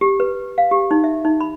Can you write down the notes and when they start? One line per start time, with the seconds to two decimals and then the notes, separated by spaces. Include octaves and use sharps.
0.01 G4
0.20 B4
0.58 F5
0.71 G4
0.91 D#4
1.04 E5
1.25 D#4
1.40 B5